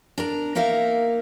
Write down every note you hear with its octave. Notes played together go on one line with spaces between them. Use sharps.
D4 A#4 A#5
A#3 D#4 A#4 E5 F5